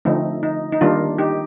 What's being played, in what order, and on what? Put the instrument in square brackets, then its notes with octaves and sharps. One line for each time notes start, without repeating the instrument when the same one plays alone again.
[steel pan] D3 F3 A3 C4 D#4
D#4
D#4
D#3 G3 A#3 D4 F4
D#4 G4